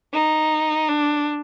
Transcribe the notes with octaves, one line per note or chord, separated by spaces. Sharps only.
D#4
D4